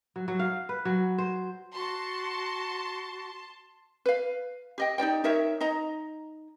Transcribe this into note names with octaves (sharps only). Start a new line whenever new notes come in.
F#3
F#3
F5
B4
F#3
C5
F#4 A5 C6
B4 F5
G4 D#5 G5
D#4 G4 D5 G5
D#4 A#4 C#5 E5
D#4 D#5 A#5